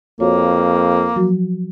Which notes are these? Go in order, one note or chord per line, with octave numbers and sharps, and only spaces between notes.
F2 A#3 F#4 C#5
F3 F#3 F#4